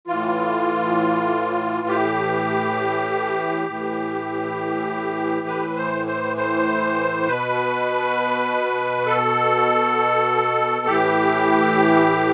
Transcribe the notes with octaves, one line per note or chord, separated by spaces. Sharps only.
A2 E3 F4
G4
A2 E3
B4
C5
C5
C5
B2 B4
A4
A2 E3 G4